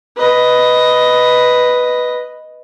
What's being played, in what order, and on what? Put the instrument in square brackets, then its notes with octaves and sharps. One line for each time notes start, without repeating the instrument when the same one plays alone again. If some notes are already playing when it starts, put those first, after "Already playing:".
[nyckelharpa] B4 D#5